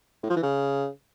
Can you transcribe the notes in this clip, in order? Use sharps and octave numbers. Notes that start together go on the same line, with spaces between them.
A2
F3
E3
C#3